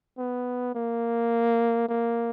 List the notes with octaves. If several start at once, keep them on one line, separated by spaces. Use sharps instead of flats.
B3
A#3
A#3